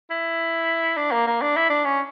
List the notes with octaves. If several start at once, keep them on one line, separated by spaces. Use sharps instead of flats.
E4
D4
A#3
A#3
D4
E4
D4
C#4